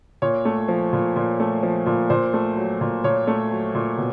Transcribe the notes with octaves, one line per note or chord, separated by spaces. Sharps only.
A#2 C#5
A3
F3
A#2
A#2
A3
F3
A#2
A#2 C5
A3
F#3
A#2
A#2 C#5
A3
F#3
A#2
B2